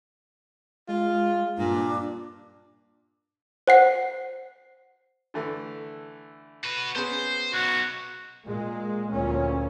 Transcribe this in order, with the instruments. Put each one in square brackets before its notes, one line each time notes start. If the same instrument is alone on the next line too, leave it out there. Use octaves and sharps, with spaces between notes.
[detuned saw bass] G#3 [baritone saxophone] F4
[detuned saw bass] G2 [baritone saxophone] A#2 [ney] D4
[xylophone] C5 F#5 C7
[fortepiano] D3 E3 A3
[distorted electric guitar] F#4 B4
[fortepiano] B3 C#4 G#4 [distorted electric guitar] C5
[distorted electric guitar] B1 [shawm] F#4
[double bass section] A#2 G#3
D2 A#2 C#4